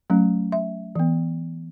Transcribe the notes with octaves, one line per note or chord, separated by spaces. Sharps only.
F#3 A3 C#4
E5
E3 B3